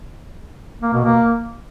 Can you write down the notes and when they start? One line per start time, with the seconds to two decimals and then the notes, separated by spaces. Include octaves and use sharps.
0.82 A#3
0.93 B2
1.05 A#3